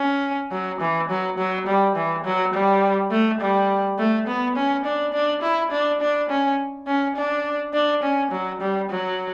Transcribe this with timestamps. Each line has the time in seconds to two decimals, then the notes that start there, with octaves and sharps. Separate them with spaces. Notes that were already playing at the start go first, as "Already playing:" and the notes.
Already playing: C#4
0.51 F#3
0.81 E3
1.09 F#3
1.38 F#3
1.67 G3
1.96 E3
2.25 F#3
2.54 G3
3.11 A3
3.41 G3
3.99 A3
4.27 B3
4.56 C#4
4.85 D4
5.13 D4
5.42 E4
5.71 D4
6.01 D4
6.30 C#4
6.87 C#4
7.16 D4
7.74 D4
8.03 C#4
8.32 F#3
8.61 G3
8.90 F#3